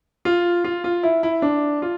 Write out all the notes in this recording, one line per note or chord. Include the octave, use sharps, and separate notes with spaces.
F4
F4
F4
E4
E4
D4
F4